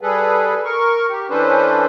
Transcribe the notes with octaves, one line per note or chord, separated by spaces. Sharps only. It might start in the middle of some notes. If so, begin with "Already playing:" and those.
G3 G#4 A4 B4
A#4 C#6
G4
E3 C#4 D4 A4 B4 C5